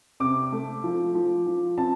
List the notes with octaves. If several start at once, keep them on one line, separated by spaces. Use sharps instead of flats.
C3 D6
A3
F3
F3
F3
C4 A5